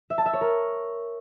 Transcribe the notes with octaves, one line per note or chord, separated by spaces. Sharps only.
E5
A5
E5
C#5
A#4